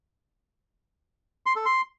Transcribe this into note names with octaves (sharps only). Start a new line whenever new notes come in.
C6
A4
C6